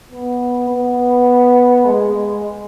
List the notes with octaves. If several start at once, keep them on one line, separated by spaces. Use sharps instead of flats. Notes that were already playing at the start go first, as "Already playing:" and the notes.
B3
B3
G#3